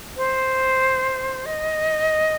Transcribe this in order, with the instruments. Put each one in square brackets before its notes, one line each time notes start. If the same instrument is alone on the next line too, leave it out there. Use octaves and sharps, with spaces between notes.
[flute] C5
D#5